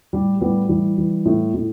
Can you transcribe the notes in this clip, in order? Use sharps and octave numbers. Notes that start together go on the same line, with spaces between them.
A2 G3
A2 G3 B3
E3 G3
E3
A2
A2